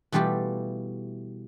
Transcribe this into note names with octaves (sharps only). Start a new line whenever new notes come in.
B2 E3 G3 A3 F4 G4